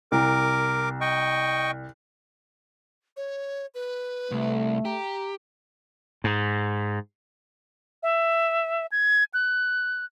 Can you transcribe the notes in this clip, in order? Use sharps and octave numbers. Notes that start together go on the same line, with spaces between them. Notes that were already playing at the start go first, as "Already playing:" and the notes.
C2 A#4 D6
D#5 G5 C#6
C#5
B4
C2 A3
G4 A#5
G#2
E5
G#6
F#6